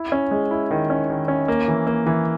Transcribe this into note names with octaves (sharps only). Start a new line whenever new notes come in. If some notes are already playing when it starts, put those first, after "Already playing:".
Already playing: E4
C#4
G#3
E4
D#3
C#4
D#3
C#4
A#3
E3
A#3
E3